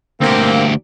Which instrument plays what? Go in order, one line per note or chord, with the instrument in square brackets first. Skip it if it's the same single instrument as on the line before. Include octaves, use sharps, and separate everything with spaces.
[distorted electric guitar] D2 G4 [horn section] A#3 C4